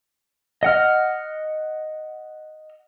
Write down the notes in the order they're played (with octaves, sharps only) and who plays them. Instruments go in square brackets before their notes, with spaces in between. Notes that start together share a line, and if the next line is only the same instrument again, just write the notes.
[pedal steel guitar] D#5 F#5 F6